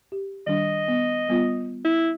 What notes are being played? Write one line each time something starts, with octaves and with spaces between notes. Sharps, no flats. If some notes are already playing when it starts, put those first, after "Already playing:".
G4
D#3 G3 D4 D#5
B3
G3 B3 F4
E4